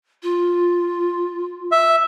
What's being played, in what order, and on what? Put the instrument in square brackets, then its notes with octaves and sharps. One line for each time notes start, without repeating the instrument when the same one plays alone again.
[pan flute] F4
[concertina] E5